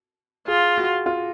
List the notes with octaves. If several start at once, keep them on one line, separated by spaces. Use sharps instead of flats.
F4 G#4
F#4
F4